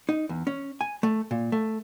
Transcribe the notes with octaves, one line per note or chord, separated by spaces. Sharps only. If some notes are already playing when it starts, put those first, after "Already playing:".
D#4
E2
C#4
G#5
A3
A#2
A3